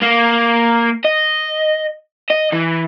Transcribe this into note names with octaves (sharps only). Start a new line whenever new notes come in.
A#3
D#5
D#5
E3